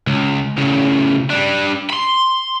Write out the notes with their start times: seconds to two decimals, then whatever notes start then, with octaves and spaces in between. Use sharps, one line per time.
0.07 C#2
0.58 A2 C#3
1.30 G3 D4
1.90 B5 C6